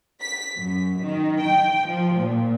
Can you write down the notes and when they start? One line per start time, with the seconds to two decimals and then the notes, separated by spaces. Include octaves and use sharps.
0.21 B6
0.57 F#2
1.02 D#3
1.44 G5
1.87 F3
2.19 A#2